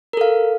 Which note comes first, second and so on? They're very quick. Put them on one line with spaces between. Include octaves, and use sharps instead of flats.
A#4 A4 F5